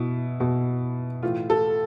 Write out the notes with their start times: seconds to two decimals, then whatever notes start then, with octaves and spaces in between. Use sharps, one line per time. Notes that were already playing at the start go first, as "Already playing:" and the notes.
Already playing: B2 E4
0.40 B2
1.23 A2 E3 F4
1.50 A4